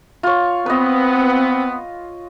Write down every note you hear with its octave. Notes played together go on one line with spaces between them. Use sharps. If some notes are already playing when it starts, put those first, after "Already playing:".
F4 C#5
B3 C4 B4 D#5